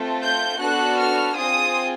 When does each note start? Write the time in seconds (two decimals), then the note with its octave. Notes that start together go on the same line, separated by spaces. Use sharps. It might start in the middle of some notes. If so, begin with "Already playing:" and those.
Already playing: A3 C4 F4 A4
0.22 G6
0.59 B3 D4 F#4 A4 F#6
0.98 F6
1.36 C4 F4 G#4 D#6